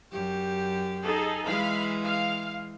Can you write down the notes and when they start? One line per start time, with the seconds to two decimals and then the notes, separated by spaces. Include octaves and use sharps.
0.12 F#2 G4
1.03 D#4 G#4 A4
1.45 E3 G#3 F5 B5
2.04 F5